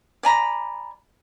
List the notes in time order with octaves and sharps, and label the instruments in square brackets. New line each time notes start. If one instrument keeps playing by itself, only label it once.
[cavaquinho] D5 G#5 A#5 B5